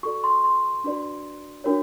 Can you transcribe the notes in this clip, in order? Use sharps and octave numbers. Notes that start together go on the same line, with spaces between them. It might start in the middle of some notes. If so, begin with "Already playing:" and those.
F#4 A4 D5 C#6
C6
C6
D4 F#4 B4 D5
D4 F#4 A#4 C#5